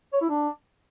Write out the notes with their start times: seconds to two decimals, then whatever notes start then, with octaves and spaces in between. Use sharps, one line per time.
0.13 C#5
0.21 E4
0.29 D4